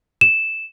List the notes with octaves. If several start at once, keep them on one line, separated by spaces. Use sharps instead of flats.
E7